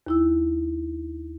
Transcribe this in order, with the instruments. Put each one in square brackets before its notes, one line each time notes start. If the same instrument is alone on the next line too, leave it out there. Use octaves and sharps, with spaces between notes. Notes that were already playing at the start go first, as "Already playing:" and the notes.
[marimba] D#2 E4 E6